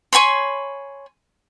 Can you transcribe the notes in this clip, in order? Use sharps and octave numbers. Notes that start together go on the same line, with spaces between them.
C#5 G#5 B5 C6